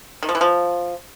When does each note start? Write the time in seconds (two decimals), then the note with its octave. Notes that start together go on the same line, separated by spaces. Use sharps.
0.23 D#3
0.29 F3
0.35 E3
0.41 F3